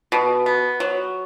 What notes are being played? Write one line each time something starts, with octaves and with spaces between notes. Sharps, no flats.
B2
B3
F#3